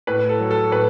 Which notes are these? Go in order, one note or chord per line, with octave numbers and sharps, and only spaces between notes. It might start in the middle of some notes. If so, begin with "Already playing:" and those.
A2 B4
A4
F#3
A4
A2 B4